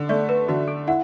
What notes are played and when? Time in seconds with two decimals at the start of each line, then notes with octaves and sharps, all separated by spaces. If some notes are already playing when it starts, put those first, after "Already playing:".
Already playing: D3
0.09 A3 D5
0.29 B4
0.48 D3 F#4
0.68 A4
0.87 E4 F#5